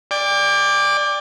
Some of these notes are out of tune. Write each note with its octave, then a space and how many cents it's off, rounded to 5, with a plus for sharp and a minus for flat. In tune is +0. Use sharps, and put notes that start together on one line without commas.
D5 +0 G5 +40